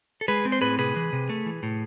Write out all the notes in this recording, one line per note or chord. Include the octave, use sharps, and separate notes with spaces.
A4
G#3 G#4 B4
C4
C5
A2 G#4 B4
C3 G#4 B4
E3
C3
A3
E3
A2